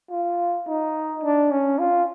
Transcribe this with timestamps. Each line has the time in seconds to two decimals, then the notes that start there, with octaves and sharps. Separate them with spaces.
0.11 F4
0.67 D#4
1.23 D4
1.51 C#4
1.79 F4